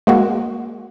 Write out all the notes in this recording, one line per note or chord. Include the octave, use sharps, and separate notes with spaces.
G#3 A#3 F#4